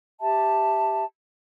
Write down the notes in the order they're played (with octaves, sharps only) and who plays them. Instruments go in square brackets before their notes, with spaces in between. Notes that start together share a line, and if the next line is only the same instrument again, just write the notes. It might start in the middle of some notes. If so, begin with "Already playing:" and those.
[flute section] G4 E5 A5